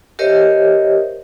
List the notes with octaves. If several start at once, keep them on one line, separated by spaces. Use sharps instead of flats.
G4 A#4 C5 C#5 D#5 E5